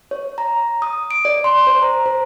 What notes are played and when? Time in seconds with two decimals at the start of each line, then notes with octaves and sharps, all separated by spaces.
0.11 C#5
0.38 A#5
0.82 D#6
1.11 D7
1.25 D5
1.44 C6
1.67 C5
1.82 A#5
2.06 C5